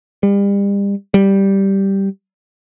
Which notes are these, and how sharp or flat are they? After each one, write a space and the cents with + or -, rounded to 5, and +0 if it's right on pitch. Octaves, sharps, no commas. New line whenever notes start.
G3 +35
G3 -5